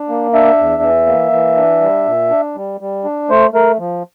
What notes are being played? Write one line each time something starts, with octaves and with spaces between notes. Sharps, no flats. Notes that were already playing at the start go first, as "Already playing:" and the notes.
Already playing: D4
A#3
D4 E5
E2
E3
A#3
E3
D4
G3
A#2
D4
G3
G3
D4
A3 C5
A3 A#4
F3